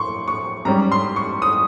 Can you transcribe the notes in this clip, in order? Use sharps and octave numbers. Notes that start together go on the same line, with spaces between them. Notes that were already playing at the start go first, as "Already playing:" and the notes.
Already playing: C6 C#6
C#6
G#2 G3 C#4 A#5
C6
C#6
D#6